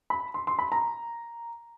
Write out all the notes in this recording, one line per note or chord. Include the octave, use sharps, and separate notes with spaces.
B5
C6
C6
B5
A#5